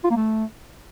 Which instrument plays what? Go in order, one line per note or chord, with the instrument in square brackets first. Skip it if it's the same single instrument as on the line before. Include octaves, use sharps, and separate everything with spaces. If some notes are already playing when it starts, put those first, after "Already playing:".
[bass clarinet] F4
A#3
A3